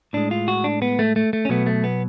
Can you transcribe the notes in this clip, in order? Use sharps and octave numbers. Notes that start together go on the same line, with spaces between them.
A2 G#3 D4
F4
F#4
D4
B3
A3
A3
A3
C#4
B2 F#3 A3 B3
A3
B3